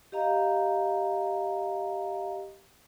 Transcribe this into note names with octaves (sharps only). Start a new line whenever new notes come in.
G4 D#5 F5 A#5